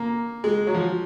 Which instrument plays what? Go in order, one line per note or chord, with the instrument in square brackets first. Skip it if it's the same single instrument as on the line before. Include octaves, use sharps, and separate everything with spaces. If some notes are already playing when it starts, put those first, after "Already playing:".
Already playing: [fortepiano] A#3
G#3
F#3
F3